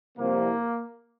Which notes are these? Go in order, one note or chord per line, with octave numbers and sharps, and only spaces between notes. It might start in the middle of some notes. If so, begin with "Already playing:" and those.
C2 C3 F3 A#3